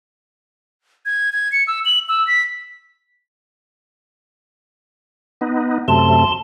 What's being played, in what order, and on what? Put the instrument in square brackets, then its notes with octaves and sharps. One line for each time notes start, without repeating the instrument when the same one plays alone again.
[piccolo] G#6
G#6
C#7
E6
F#7
E6
B6
[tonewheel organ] B3 D#4
[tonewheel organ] F#2 C3 A3 [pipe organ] A5 C6